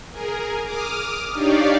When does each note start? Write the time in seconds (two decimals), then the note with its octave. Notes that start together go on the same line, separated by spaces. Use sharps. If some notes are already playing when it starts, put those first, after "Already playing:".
0.11 G#4 A#4
0.63 D6 D#6 F6
1.32 D4 D#4 G4 C#5 D5 F5